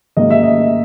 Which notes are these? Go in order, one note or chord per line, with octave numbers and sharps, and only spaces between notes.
G#2 D#3 F#3 A#3 D#5
E5
D#5